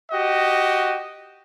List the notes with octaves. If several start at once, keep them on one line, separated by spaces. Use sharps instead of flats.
F#4 G4 D#5